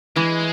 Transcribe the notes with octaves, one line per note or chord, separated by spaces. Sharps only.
E3 G#3